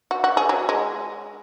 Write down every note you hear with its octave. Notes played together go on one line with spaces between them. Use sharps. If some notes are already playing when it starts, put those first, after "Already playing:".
F#4
F#4
G#4
F#3
G#3